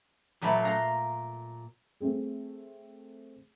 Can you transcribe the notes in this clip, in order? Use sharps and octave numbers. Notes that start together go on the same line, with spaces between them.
A#2 F#3 A3 B4 B5
F5 A#5 C6
A3 C4 G#4